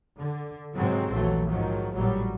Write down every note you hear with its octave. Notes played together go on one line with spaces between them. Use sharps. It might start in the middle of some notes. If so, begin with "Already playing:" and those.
D3
G#2 C3 D#3 F#3 G#3 C4
A#1 D#2 E3 F#3 A3
G#2 D#3 F3 F#3
A1 A#2 E3 F#3 G3